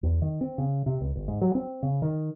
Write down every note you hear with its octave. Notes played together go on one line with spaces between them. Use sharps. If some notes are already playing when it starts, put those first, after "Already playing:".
E2
D#3
C4
C#3
C3
C#2
G1
G#2
F#3
C4
C#3
D#3